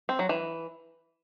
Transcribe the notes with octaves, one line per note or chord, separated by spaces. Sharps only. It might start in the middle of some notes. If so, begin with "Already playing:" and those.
C4
F#3
E3